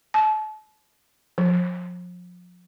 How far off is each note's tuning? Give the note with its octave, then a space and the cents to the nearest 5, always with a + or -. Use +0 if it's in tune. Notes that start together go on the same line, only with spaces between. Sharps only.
A5 -35
F3 +35